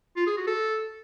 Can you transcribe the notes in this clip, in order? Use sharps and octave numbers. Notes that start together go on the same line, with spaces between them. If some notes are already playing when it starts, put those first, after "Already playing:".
F4
G#4
F#4
A4